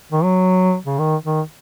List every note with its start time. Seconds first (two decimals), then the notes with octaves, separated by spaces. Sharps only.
0.12 D#3
0.23 F#3
0.86 C#3
0.99 D#3
1.24 D#3